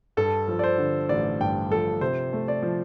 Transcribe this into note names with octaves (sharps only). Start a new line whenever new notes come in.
G2 A4
F3
D5
C5
D3
A1 D5
G2 G5
F3 A4
C3 C5
A3
D5
F3